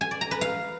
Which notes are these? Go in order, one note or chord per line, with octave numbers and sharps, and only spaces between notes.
G#5
D5
A#5
B4
F5